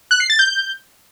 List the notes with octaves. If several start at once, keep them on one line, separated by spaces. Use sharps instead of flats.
F#6
C7
A6
G6